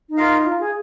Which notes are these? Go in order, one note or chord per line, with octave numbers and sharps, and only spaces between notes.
D#4
F4 A#4 F5
F4
G#4